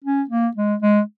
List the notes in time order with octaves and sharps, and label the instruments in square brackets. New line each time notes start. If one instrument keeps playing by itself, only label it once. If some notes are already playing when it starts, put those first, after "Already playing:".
[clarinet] C#4
A#3
G#3
G#3